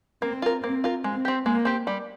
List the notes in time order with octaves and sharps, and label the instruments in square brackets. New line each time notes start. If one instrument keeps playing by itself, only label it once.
[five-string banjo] A#3 [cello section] C4
[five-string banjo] F4 A#4
[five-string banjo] A#3 [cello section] C4
[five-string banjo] F4 A#4
[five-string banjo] G#3 [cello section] C4
[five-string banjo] C4 G4
[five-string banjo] G#3 [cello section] A#3
[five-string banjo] C4 G4
G3